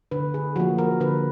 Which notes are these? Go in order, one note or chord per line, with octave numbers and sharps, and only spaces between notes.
D3 B4
G#4
F3 A#3 F#4
A#4
D3 B4